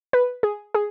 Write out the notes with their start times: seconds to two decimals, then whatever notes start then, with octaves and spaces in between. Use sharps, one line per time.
0.13 B4
0.43 G#4
0.74 G#4